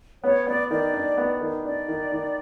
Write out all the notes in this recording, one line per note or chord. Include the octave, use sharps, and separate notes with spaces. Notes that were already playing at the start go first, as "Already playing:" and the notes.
B3 C#5
B3 D5
D#3 D5
D4
B3
D#3
D4 D5
D#3
D#3